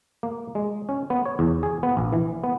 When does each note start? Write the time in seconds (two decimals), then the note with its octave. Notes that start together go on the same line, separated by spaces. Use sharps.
0.23 A#3
0.55 G#3
0.89 C#4
1.10 B3
1.25 C#5
1.39 E2
1.63 G#4
1.83 B3
1.97 A#1
2.13 E3
2.44 B3